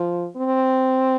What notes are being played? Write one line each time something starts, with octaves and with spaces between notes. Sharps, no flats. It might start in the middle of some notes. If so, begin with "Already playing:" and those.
Already playing: F3
C4